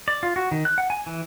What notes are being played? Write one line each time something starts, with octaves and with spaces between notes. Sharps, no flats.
D5
F4
F#4
D#3
F#6
F#5
G#5
E3